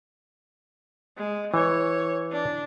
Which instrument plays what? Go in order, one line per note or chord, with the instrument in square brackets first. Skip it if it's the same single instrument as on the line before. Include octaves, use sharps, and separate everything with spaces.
[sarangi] G#3
[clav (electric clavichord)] E3 [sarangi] C#5
[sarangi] D4